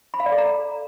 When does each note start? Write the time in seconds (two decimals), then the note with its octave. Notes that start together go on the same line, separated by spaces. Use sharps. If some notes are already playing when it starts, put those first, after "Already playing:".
0.14 B5
0.20 F5
0.26 D5
0.32 A4
0.38 A#5